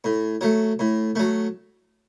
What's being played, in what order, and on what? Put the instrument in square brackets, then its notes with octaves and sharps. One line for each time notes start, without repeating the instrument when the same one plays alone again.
[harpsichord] A2
F#3 A3
A2
F#3 A3